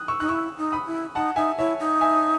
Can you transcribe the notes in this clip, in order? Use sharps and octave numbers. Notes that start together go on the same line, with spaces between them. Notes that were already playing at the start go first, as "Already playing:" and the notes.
Already playing: D#6 F#6
C#6 E6
D#4 F#6
E4 C#6 E6
D#4
B5 D#6
E4
D#4 F#5 A5
D#4 E5 G#5
E4 C#5 E5
D#4
E5 G#5